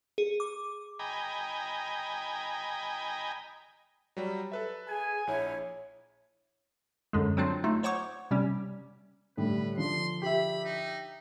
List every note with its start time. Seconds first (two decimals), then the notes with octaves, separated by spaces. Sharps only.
0.18 G#4
0.40 D6
0.99 D#5 G5 G#5 A#5 B5
4.17 F#3 G3
4.52 A4 B4 E5
4.89 G#4 G#5
5.27 A#1 E4 C#5
7.13 F#2 D3 G#3
7.37 F#3 C4 D4 F4
7.64 A3 D#4 F4
7.83 C5 C#5 F#5 C#6 D6
8.31 C3 G3 C#4
9.37 A2 D3 G3 B4
9.77 D3 F3 C6
10.22 G4 E5 B5
10.65 D#4